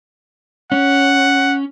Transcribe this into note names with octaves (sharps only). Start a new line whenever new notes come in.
C#4 F#5